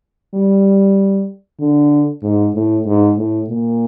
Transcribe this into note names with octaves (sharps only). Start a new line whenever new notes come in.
G3
D3
G#2
A2
G#2
A2
A#2